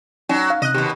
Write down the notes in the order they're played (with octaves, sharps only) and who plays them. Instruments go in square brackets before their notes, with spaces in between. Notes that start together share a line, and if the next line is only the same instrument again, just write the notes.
[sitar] F#3 [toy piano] C#4 D#4 D5
[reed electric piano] F5
[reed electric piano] C3 F#6 [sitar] D#5
[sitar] D#2 B2 [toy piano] G4